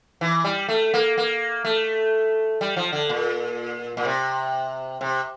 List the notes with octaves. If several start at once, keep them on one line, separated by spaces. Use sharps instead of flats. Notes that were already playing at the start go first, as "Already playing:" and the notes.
E3
G3
A3
A#3
A#3
A3
G3
F3
D3
A#2
A#2
C3
C3